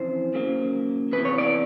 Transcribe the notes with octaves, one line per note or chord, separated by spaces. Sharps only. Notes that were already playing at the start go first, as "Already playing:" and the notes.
Already playing: F2 C#3 E3 C5
D#2 C#3 F#3 A#3
E2 C3 E3 B4
C#5
D5